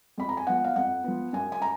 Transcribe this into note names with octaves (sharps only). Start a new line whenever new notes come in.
F2 B5
A#5
G#5
F3 B3 F#5
F5
F2 F#5
F3 B3
F#2 G#5
G#5
A#5